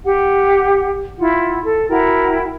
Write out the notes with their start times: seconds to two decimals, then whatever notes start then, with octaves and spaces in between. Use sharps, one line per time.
0.04 G4 F#5
1.18 E4 F4 F#5
1.65 A4
1.89 E4 F#4 A#4 G5